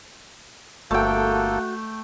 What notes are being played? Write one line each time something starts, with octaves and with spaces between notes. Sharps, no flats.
G1 A3 A#3 F#4 A4 G5